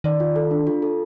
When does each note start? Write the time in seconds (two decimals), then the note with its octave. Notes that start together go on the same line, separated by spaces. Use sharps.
0.04 D#3 D5
0.20 F4
0.36 A4
0.51 D4
0.67 F4
0.82 A4